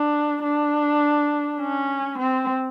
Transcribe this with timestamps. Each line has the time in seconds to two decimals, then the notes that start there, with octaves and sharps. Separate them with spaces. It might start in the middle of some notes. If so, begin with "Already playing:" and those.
Already playing: D4
0.43 D4
1.59 C#4
2.18 C4